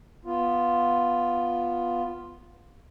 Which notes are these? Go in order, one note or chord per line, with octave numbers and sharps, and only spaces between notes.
B3 F4